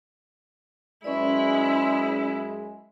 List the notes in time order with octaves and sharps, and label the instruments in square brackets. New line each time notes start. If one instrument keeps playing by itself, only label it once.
[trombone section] F#2 G#3 [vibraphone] C#4 B4 D5 [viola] E4